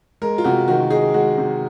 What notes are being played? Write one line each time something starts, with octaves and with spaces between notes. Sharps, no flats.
G#3 A#4
F4
C3 F#4
D#3 F#4
D#4 G#4
G#3 F#4
C3